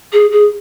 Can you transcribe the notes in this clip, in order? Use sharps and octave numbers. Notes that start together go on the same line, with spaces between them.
G#4
G#4